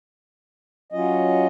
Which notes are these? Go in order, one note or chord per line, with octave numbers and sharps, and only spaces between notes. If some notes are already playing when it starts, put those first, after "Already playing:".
F#3 C#4 F4 D#5